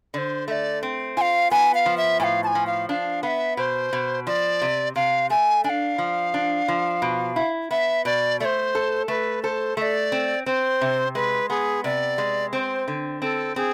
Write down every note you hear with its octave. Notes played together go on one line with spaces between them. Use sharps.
D3 C5 D5
A3 D5 E5
C4
F4 F5 G#5
B3 G#5
F5
F3
E5
A2 F5 G#5
A5
G#5
F3
F5
D4 F5
B3 E5 F5
B2 C5
B2
F3 D5
C3
C3 F5
A3 G#5
D4 F5 G#5
F3
D4
F3
B2
E4
B3 E5
B2 D5
A3 C5 D5
A4
A3 B4
A4 C5
A3 D5 E5
C4
C4 C5
C3
G#3 B4
B3 G#4
C3 D5
G#3
C4 C5
D3
C4 A4
C4 G#4